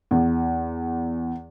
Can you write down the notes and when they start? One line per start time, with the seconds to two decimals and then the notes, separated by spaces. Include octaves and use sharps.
0.11 E2